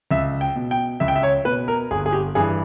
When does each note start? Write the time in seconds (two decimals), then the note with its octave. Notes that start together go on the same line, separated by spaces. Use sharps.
0.11 C#2 E5
0.41 G5
0.56 B2
0.71 G5
1.00 C#2 E5
1.08 G5
1.16 E5
1.23 C#5
1.45 B2 B4
1.68 A#4
1.91 G1 G#4
2.06 G#4
2.13 G4
2.35 G2 E3 G#4